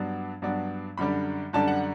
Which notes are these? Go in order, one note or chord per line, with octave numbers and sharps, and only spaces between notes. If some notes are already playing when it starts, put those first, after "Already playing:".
Already playing: G2 F#3 B3 D4
G2 F#3 B3 D4
F#2 D3 G3 D4 B5
F#2 D3 G3 D4 A5
F#5